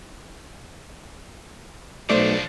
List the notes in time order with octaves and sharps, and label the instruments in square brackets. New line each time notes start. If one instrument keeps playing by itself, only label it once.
[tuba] B1 [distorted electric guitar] F3 D4 [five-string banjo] A3 [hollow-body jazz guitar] C5 D5